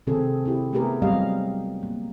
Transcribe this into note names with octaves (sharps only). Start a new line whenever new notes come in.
C3 D#3 C4 G#4 A4
C4 E4 G4
A3 B3 G4 G#4 A#4
F#3 G3 C4 G4 D#5 F5
A#3